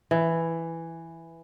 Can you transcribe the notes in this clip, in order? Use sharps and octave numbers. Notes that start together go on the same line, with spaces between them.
E3